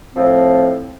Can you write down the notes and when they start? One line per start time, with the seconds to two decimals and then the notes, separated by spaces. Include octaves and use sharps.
0.15 A2 F3 C4